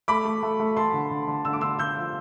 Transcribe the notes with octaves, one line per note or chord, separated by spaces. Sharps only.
A3 B5 D6
A3
A3
A3
A3 A5 C6
D3
D3
D3
D3 E6
D6
D3 C6 E6
D3 E6 G6
F3